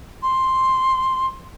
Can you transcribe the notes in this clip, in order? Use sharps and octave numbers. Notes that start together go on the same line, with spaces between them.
C6